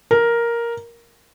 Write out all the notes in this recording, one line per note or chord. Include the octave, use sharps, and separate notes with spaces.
A#4